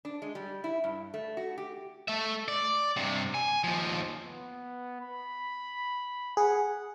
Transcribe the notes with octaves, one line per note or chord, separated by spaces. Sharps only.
D4
G#3
G3
E4
G2
A3
F#4
G4
A3 E5
D5
G2 C3
G#5
D#2 F3
B3
B5
G#4 F#5